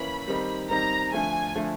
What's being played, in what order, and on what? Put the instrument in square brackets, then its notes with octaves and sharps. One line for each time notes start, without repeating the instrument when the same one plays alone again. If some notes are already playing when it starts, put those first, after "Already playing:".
Already playing: [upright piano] E3 A#3 C#4 E4 [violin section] B5
[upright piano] D#3 G3 C4 D#4
[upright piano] D#3 G3 C4 D#4 [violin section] A#5
[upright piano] D3 F3 A3 [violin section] G#5
[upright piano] D3 F3 A3